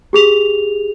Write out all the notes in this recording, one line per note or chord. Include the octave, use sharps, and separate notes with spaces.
G4 G#4 F7